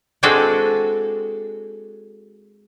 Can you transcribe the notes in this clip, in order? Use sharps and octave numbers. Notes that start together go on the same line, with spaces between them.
G#3 C4 D4 F#4 G#4 A4